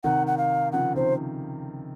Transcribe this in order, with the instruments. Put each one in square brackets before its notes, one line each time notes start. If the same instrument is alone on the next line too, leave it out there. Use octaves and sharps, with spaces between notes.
[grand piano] C3 D#3 [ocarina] F#5
[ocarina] F#5
F5
[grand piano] C#3 F3 [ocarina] F#5
[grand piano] C3 D#3 [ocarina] C5